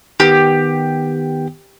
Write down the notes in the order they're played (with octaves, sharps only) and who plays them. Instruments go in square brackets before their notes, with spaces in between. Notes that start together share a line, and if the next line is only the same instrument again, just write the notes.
[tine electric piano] D#3 B3 [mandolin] G4